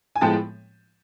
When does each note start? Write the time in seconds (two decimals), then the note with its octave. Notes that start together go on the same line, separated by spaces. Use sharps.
0.16 G#5
0.21 A2 F3 G#3 B3 G5 A5